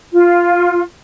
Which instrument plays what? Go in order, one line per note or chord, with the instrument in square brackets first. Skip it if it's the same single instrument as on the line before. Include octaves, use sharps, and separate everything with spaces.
[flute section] F4